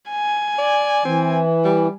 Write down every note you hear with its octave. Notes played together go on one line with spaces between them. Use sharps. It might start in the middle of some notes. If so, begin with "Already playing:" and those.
G#5
D5
E3 C4
G3